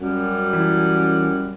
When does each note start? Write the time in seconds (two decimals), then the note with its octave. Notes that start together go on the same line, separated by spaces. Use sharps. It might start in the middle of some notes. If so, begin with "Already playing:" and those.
0.01 F#2 G3
0.53 E3